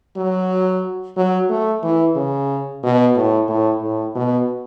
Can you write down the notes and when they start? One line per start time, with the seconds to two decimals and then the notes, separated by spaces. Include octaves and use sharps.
0.16 F#3
1.17 F#3
1.49 A3
1.83 E3
2.16 C#3
2.83 B2
3.16 A2
3.48 A2
3.82 A2
4.15 B2